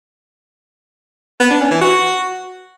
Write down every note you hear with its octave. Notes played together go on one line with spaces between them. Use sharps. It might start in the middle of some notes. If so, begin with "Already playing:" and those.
B3
D4
C#4
E3
F#4